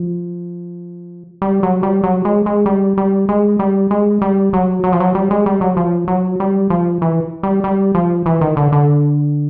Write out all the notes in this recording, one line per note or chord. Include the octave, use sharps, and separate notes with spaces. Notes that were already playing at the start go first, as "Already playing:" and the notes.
Already playing: F3
G3
F#3
G3
F#3
G#3
G#3
G3
G3
G#3
G3
G#3
G3
F#3
F#3
F3
F#3
G3
G#3
G3
F#3
F3
F#3
G3
F3
E3
G3
G3
F3
E3
D#3
D3
D3